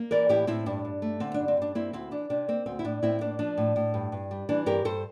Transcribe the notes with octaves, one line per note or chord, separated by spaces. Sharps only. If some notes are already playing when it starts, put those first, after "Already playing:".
Already playing: A#3
E3 A#4 D5
A2 E4 G4
A2 C4 E4
G2 D4
G2
A3
D3 C4
G2 D4
C4
G2 D4
A#3 C4 E4
D2 C4 E4
E3 D4
C3 D4
A#3 C4
D2 C4
E4
A2 D4
A2 C4 E4
A#3 D4
F3 D4
A2
A2
G2
G2
G3
E3 D4
G2 G4 A#4
G2 A4 C5